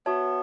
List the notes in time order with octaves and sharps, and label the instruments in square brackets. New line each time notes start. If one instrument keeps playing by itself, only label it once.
[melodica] B3 [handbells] F#4 C#5 E5 A5